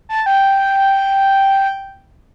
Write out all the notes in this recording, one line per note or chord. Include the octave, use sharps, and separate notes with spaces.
A5
G5